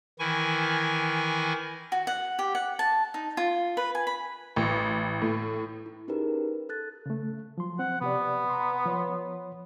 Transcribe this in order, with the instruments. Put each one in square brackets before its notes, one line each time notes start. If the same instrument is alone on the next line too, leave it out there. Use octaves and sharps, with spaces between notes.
[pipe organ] D#3 E3 E4 G#5 C#6
[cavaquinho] F#4
F#5
G4
F#5
A5
D#4
F4
B4
G#5
B5
[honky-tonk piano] A1
A2
[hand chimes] E4
C#4 D#4 G4 G#4 A#4 B4
A4 F#6 A6
[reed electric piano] C#3 A3
F3 F#3 C6
[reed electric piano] C4 [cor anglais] F#5
[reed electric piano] C3 G4 D5 [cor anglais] B3
[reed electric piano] A#5 C6
F3 C#5 C6